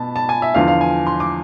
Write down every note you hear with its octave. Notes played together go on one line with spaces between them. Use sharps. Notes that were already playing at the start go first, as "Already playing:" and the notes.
Already playing: B2 A5 B5
A5
G#5
E5
E2 D3 F3 F5
F5
G#5
C6
D6